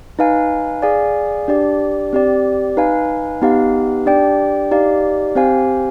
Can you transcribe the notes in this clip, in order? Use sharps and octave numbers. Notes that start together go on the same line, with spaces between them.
D#4 B4 F5 G#5
G#4 D5 F5 G#5
D4 G4 D5
C4 G4 D5
D#4 B4 F5 G#5
B3 D#4 G4 B4 F5
D4 G4 D5 G5
D#4 G4 D5 F5
C4 G4 C5 F5 G#5